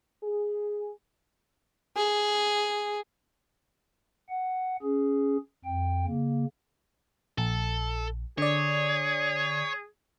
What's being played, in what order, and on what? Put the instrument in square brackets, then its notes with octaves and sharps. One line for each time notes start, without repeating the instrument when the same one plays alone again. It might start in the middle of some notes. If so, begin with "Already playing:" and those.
[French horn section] G#4
[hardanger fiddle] G#4
[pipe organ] F#5
C#4 G#4
F2 G5
C#3 A#3
[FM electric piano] A#1 [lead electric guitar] A4
[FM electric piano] D3 D5 [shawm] G#4 [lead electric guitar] C#5